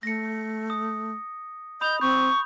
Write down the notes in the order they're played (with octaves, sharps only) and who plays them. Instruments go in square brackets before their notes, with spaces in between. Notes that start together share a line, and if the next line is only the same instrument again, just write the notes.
[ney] A3 [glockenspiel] A#6 C#7
[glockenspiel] D#6
[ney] D#5 [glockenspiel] B5 D#6 F7 [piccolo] G6
[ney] C4 [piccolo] C#6 [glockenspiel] G6